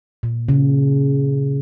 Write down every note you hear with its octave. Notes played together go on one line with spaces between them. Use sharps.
A#2
C#3